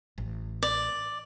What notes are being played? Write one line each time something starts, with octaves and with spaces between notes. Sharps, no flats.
A1
D5